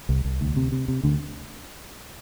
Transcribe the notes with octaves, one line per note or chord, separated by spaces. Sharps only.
C2
C2
D2
C3
C3
C3
D2 D3